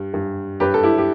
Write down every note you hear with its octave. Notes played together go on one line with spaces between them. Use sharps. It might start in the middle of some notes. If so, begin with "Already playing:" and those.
Already playing: G2
G2
G2 G4 B4
A4
E4 G4
G4